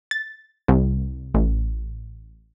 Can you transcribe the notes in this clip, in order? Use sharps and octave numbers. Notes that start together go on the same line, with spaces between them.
A6
C2
A1